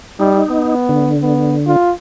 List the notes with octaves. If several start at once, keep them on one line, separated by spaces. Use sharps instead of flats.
G3 D#4
B3
D3
B3
F4